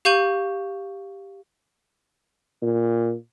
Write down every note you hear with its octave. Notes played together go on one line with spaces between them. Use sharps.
G4 F5 C#6 G6 D#7 F#7
A#2